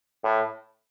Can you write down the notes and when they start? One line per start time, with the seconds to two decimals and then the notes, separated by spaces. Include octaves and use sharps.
0.24 A2